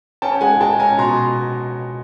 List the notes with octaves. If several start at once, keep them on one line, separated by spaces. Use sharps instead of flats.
C#4 G5 A5
G#3 F#5 G#5
G#3 G5 A5
C#4 G#5 A#5
B2 A#5 C6